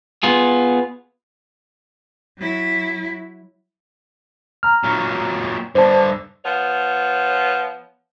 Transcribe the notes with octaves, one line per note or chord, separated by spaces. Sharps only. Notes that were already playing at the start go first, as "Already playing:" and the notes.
B3 F4 G#4
F#3 E4
A#5 F6
A#2 F#3
G2 D3 C5 A5
F3 B3 C#5